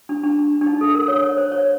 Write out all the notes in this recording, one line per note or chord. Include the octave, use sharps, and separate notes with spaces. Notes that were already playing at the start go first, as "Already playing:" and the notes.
D4
D4
D4
D#4
A4
A#4
C#5
C#5
C5
C#5